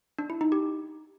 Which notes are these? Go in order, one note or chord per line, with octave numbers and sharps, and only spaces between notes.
D4
E4
D#4
G4